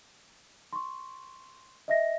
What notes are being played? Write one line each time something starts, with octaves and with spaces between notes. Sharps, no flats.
C6 C#6
D#5 E5 A#6